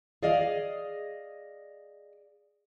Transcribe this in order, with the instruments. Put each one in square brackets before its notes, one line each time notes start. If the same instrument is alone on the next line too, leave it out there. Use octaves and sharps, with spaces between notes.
[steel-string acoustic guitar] G#4 D5 D#5 F5